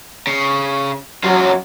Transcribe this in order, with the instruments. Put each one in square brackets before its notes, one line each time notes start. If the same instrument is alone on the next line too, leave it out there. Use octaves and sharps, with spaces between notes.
[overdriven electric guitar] C#3
[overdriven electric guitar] F#2 F4 [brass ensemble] F#3